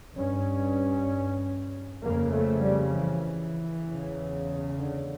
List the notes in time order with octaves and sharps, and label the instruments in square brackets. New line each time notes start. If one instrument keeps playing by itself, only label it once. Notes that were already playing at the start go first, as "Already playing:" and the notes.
[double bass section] G2 C#4
F2 C#3 A#3
A3
G3
E3
E2 C#3
D3